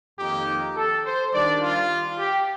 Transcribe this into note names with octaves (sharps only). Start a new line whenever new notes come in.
F2 D#3 A#3 D#4 G4
A4
C5
D#3 G3 D4 D5
F4
G4